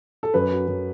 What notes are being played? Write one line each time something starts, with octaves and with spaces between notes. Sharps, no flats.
A4
F#2 B4
F#3
F#2